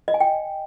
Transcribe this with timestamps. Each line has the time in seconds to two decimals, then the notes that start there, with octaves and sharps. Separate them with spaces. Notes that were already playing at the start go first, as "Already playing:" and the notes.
0.08 D#5
0.14 G#5
0.20 G5